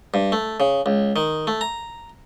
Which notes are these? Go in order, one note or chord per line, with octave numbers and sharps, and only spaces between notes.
G2
A3
C#3
C#2
D#3
A3
A#5